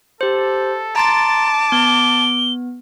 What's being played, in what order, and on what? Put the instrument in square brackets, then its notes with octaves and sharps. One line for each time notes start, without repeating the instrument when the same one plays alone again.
[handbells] G4 C5 [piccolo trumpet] A4
[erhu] A5 [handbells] A#5 C6 A6 [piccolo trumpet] D6
[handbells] B3 [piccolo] G7